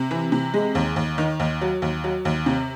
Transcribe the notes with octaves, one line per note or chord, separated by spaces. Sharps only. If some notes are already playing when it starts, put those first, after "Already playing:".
Already playing: C3
E3
C3
G#3
D#2
D#2
D#3
D#2
F#3
D#2
F#3
D#2
C3